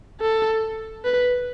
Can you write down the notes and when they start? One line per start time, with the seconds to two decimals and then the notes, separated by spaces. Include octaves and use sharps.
0.21 A4
1.04 B4